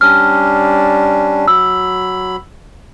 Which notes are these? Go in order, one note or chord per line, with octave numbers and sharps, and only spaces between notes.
G3 C#4 D4 F6
F#3 B5 E6